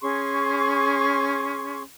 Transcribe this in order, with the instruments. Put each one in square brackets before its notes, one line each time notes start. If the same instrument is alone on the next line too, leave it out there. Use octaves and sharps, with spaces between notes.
[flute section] C#4 G#4 C6 C#6